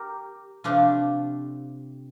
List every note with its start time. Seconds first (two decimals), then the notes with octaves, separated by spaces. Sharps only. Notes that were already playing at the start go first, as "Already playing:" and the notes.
Already playing: G4 A#4
0.64 C3 F3 A3 D4 F4